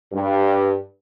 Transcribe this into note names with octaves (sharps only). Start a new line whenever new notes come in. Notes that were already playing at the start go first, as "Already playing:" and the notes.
G2